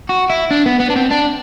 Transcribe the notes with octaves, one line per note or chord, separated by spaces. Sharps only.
F#4
E4
D4
B3
B3
D4
C4
D4